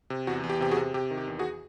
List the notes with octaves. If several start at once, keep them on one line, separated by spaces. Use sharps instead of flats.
C3
E2 F#4
E2
G4
C3 G4
F#4 G#4
C3
C3 G4
D#3
G4
E2
F#4 G#4